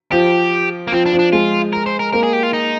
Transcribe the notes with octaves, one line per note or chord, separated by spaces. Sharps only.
F3 G4
A#3
F3 C4
D4
F3
D4
G#3 F4
A#4
C5
A#4
A#3 A#4
G#4
G4
F4
D#4